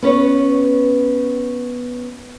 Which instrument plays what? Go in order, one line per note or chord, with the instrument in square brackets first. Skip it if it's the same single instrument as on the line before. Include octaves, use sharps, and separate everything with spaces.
[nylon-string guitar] B3 C#4 B4 C#5